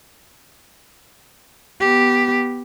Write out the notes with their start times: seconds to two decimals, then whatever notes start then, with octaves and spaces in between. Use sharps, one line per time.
1.81 B3 G4